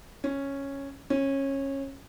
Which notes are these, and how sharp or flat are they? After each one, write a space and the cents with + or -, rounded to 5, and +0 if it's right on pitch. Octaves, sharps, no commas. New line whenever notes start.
C#4 -5
C#4 -20